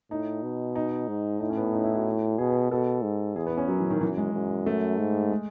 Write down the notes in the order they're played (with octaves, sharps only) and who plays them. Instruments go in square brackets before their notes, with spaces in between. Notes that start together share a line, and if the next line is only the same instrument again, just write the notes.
[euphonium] A2 [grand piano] D#4
[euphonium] B2
[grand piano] D#4
[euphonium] G#2
[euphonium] A2 [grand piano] D#4
[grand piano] C#4
B3
C#4
D#4
E4
F#4
[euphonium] B2 [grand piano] G#4
[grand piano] B4
[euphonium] B2 [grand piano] A4
[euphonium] G#2
[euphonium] E2 [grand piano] G#4
[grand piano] B3
C#4
[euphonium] F#2 [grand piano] F#3
[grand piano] E3
D#3
[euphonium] F#2 [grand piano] E3
[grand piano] G#3
[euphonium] F#2
[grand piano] A3
[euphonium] G#2
[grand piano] G#3